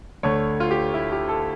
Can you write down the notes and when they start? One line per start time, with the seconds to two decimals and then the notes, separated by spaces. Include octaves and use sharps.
0.23 D2 D3 A3 C#5
0.60 F4
0.71 G4
0.94 E4
1.12 G4
1.29 A4